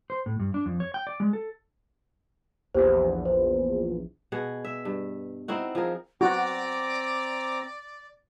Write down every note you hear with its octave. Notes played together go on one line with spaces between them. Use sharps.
C5
A2
G2
D4
F2
C#5
G5
D5
G#3
A4
A#1 E2 G4 C5
C5
B2 G#4 F#5
E5
G2
C4 D#4 E4 F#4
F3 G#4 A#4
C4 F#4 D5 A#5 D6